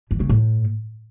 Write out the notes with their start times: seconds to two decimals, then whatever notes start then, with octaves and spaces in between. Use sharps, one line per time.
0.11 E3
0.20 C#3
0.29 A2